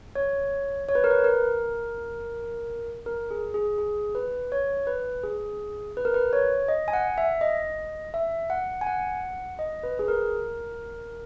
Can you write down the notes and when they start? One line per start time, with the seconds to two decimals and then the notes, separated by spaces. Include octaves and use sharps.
0.15 C#5
0.89 C#5
0.95 B4
1.04 A#4
1.11 B4
1.24 A#4
3.06 A#4
3.31 G#4
3.54 G#4
3.78 G#4
4.15 B4
4.52 C#5
4.87 B4
5.23 G#4
5.97 B4
6.05 A#4
6.14 B4
6.33 C#5
6.68 D#5
6.88 G#5
6.93 F#5
7.18 E5
7.41 D#5
8.14 E5
8.50 F#5
8.81 G#5
8.87 F#5
9.59 D#5
9.83 B4
9.99 G#4
10.08 A#4